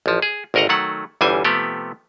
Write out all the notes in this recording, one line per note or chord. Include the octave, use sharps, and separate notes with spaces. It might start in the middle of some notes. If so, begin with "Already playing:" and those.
A1 F3
G#4
G#1 D2 A#4 D#5 F#5 A#5
D#3 F#3 A3 F#5
G1 E2 E3 G3 C5 G#5
C3 F3 A3 B3 G4